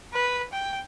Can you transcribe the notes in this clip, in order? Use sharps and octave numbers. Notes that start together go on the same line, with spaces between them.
B4
G5